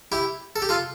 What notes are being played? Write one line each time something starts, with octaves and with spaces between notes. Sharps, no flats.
E4 G4
A4
G4
F4 A4